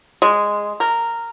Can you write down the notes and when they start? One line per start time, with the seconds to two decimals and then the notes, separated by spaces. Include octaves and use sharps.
0.22 G#3
0.80 A#4